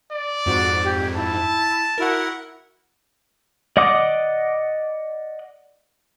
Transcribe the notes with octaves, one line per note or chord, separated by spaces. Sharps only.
D5
F2 G#2 F#4
G4 G#6
E4 A5
E4 F#4 A#4 F#5
D5 D#5 F#5 D6 D#6